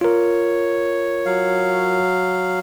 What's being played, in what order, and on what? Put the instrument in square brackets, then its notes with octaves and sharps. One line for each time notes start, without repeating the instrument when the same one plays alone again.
[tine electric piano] F4 A#4 [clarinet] C#5
[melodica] F#3 F5